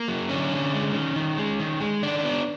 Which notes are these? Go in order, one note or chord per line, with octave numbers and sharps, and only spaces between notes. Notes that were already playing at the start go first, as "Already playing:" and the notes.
Already playing: A#3
F#3
D3 C#4
D3
G#3
D#3
D#3
G#3
D#3
G#3
D#3 D4
B3